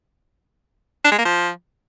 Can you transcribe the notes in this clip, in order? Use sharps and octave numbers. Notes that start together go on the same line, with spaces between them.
D4
G#3
A#3
F3